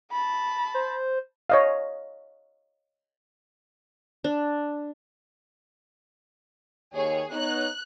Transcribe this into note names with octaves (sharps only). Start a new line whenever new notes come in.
A5 B5
C5
C#5 D#5 F5
D4
D#2 G#4 C#5
B3 D#4 C#5 F#6